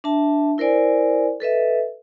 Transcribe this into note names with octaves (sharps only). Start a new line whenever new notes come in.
D4 E5 A5
E4 A#4 C5 D5 G#5
A4 B4 D#5 E5